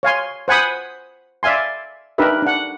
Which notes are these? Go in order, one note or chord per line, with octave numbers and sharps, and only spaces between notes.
C#5 F5 G#5 C6
C5 F#5 G#5 B5 D#6
D5 E5 F5 G#5 C6
D4 D#4 G4 A#4 B4 E5
D4 F#5